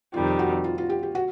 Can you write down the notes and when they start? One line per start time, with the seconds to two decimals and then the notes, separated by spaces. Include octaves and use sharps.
0.13 F2 C3 D#3 G3 F4
0.39 F#4
0.64 F4
0.78 F4
0.90 G4
1.03 G4
1.15 F#4